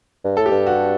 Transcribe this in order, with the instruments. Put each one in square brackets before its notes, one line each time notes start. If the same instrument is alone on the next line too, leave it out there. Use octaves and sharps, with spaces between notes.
[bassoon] G2
[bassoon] A2 [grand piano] A4
[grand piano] G4
[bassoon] G2
[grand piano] F#4